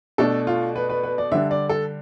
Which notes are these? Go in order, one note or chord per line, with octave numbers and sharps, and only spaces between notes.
B2 A3 D4 A4
F4
B4
B4
B4
D5
D3 G3 D4 E5
D5
A4